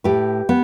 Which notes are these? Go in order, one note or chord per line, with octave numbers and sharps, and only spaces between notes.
A2 G4 B4
B3